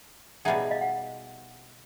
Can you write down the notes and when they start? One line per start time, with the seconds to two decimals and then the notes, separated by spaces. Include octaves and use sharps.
0.45 B2 G3 B3 D#4 G#4 E5 F#5
0.71 D#5 F5
0.81 F#5